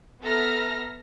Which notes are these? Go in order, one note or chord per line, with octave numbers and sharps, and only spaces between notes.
B3 A4 E5 A#5 F6 A#6